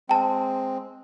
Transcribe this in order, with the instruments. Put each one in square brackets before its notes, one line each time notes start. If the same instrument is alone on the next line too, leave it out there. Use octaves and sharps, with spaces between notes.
[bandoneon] G#3 C4 [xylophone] G5 A5